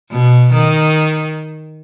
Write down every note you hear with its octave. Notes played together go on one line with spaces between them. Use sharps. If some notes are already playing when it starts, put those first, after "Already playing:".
B2
D#3